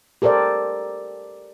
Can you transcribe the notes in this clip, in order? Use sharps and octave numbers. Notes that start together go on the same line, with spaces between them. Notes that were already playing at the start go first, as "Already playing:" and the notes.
G4 A4 A#4 C5 D5